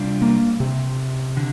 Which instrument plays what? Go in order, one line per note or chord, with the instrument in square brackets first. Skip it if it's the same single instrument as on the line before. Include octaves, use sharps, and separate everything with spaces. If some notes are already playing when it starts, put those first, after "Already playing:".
Already playing: [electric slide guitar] C3 G3 D4 F4
[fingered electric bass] A#3
C3
[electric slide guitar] D3